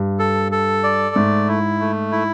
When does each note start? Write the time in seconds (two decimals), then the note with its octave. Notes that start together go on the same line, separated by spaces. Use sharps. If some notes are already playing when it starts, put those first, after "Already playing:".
Already playing: G2
0.19 A4
0.52 A4
0.84 D5
1.15 G#2 A3
1.48 E4
1.80 A3
2.12 E4